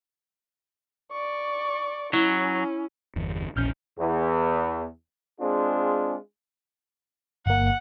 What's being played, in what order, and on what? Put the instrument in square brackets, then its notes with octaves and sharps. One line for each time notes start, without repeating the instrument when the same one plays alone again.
[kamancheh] D5 C#6
[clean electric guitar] F#3 [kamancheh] C#4 [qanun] E4
[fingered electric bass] G1 E2
[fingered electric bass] E1 C#4 [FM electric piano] A#1 F6 G6
[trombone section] E2
G#3 C4 D4 F4 G#4
[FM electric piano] G1 A#3 [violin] F#5